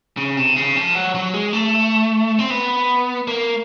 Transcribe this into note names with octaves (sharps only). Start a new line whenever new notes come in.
C#3
C3
C#3
F3
F#3
F#3
G#3
A3
C4
B3
A#3